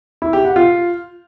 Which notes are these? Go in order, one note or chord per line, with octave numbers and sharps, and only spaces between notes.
E4
G4
F#5
F4